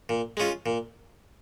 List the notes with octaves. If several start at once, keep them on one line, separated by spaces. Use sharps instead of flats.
A#2
G#3 C#4 F4
A#2